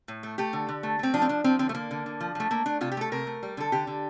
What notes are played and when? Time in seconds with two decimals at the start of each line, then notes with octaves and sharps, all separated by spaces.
0.08 A2
0.23 A3
0.38 A3 G4
0.53 D3
0.69 D3
0.83 A3
0.99 A3 C4
1.14 F3 D4
1.22 C4
1.29 F3 D4
1.44 F3 C4
1.59 D3 C4
1.69 A3
1.74 D3 A#3
1.91 D3
2.06 D3
2.21 F3
2.35 F3 A3
2.50 A3 A#3
2.66 A3 D4
2.81 C3 F4
2.92 G4
2.97 A3 A4
3.12 C3 A#4
3.27 A3
3.43 G3
3.57 D3 A4
3.72 D3 G4
3.87 D3